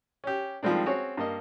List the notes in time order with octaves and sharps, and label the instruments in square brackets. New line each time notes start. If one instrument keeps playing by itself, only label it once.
[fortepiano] C#4 G4
D#3 F3 G3 G#3 C4 D4
C4 C#4 F#4 G#4 C#5
G2 A#3 D#5